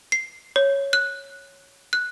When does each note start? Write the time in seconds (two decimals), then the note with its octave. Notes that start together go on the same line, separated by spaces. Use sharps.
0.12 C7
0.56 C#5
0.93 F#6
1.93 F#6